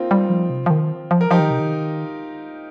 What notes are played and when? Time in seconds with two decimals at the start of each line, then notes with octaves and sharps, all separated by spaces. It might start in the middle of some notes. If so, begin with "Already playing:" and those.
Already playing: A#3 C4 D#4 F4
0.11 G3
0.30 F3
0.50 C3
0.66 F3
0.70 D#3
1.11 F3
1.21 A#4
1.31 F3 D#4 G4
1.40 D#3
1.50 C3
1.60 D#3